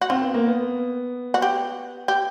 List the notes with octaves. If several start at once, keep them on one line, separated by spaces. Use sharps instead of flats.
F#4
C4 F4
B3
A#3
B3
F#4
G4
G4